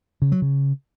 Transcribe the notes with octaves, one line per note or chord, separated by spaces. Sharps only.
C#3
F#3
C#3